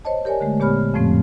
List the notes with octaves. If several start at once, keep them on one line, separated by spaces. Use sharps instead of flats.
C5 C#5 D#5 A5
G4 A#4 C#5 D5 G#5
D3 G#3 A3
A#2 B3 G4 C#5 B5 F6
F2 A2 F3 A3 C4